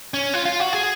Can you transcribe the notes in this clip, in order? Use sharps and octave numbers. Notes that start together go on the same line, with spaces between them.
C#4
F4
F4
F#4
G#4